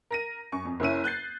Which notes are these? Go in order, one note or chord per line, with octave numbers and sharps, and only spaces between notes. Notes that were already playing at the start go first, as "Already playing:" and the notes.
A#4 A#6 D#7
F#2 C#6
F2
F#1 C#4 E4 D#7
F#6 G6 A6 C7